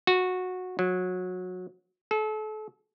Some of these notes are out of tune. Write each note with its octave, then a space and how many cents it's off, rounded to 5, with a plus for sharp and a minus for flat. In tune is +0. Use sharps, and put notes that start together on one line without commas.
F#4 -15
F#3 -20
A4 -35